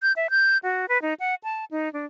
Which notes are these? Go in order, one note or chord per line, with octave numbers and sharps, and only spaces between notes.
G6
E5
G6
F#4
B4
D#4
F#5
A5
D#4
D4